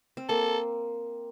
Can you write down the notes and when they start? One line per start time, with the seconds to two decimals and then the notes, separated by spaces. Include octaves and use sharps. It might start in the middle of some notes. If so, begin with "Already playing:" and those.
0.17 C4
0.29 A#3 A4